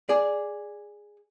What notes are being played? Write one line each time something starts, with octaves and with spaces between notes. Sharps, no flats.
G#4 D5